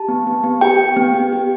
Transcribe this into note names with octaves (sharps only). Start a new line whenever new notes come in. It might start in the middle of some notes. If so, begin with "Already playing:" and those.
Already playing: G4 A5
B3
B3
B3
G4 G5
G4
B3
G4
G4